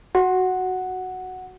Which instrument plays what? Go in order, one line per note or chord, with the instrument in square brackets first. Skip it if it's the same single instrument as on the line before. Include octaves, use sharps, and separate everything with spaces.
[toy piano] F#4 [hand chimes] F#5